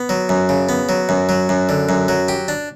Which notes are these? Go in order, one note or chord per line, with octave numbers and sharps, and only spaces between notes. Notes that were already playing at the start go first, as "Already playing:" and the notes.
Already playing: B3
F#3
F#2
C#3
B3
F#3
F#2
F#3
F#2
D3
F#2
F#3
G4
D4